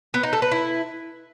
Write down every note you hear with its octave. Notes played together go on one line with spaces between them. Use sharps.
B3
D#4
A4
B4
E4